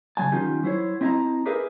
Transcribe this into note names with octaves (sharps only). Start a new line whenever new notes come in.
C#3 E3 F#3 G#5 A5
D#3 F#3 C#4 D#4 F4 G4
F#3 E4 C5 C#5
C4 E4 D#5 E5 A5 A#5
G4 G#4 A#4 B4 E5